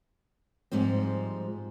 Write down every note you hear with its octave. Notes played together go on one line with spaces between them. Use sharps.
G#2 F3 G3 C4